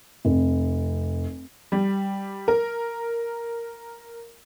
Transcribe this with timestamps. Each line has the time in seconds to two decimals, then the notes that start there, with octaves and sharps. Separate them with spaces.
0.25 F1
1.72 G3
2.48 A#4